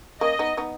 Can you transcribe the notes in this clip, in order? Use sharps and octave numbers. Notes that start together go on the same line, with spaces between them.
A#3 C#4 D#5
B3 D#4
B3 D#4